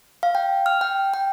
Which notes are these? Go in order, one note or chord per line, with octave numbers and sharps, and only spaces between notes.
F5
G5
F6
G5
G5